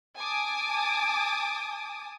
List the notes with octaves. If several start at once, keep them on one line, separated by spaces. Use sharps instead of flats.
G#5 A5 D6 D#6